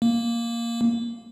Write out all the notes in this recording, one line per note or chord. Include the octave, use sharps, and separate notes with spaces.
A#3